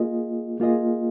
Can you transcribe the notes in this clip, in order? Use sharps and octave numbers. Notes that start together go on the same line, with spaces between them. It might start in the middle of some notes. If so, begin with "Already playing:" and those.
Already playing: A#3 F4 G#4 D#5
A#3 F4 G#4 D#5